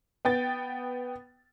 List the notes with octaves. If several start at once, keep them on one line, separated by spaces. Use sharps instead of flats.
B3 G5 A6